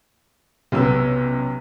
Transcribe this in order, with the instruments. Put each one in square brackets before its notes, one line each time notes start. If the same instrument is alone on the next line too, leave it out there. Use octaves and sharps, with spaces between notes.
[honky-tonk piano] B1 C#4 E6 [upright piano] C3 B3